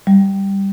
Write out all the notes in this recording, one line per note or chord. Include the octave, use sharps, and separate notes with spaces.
G3